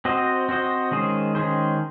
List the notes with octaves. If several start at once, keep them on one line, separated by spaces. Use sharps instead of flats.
C4 F#4 C5 D#5
C4 F#4 C5 D#5
D#3 G#3 C#4 G#4 C5
D#3 G#3 C#4 G#4 C5